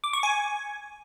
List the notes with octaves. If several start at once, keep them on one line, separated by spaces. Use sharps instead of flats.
D6
C#6
G#5